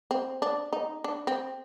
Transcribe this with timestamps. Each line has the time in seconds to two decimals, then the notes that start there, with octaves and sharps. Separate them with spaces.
0.11 C4
0.42 D4
0.73 D#4
1.04 D4
1.27 C4